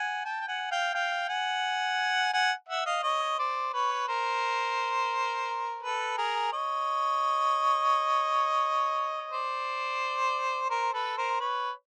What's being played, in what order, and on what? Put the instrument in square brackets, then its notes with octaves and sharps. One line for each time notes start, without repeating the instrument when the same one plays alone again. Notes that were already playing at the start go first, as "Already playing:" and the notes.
Already playing: [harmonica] F#5 G#5
G5 A5
G5
F#5 G#5
F5 G5
F5 G5
F#5 G#5
F#5 G#5
E5 F#5
D#5 F5
C#5 D#5
C5 D5
B4 C#5
A#4 C5
A4 B4
G#4 A#4
C#5 D#5
C5 D5
A#4 C5
A4 B4
A#4 C5
B4 C#5